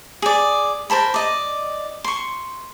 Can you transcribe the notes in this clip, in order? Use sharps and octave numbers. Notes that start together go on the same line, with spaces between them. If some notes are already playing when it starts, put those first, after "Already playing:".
G#4 D5
A#4 C5 A5 B5
D5 D#5
C6 C#6